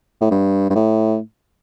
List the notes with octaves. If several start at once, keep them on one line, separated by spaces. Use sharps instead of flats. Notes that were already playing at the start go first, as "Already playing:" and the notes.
A2
G2
G2
A2